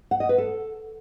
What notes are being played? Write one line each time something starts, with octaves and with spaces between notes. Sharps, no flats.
F#5
D#5
B4
A4